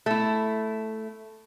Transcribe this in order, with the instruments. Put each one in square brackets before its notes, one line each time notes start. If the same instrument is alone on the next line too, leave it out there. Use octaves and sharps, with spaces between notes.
[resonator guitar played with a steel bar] A3 E4